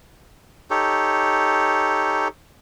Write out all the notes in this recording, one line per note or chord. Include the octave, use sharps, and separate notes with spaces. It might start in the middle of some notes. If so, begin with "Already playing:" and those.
D#4 G4 A4 C#5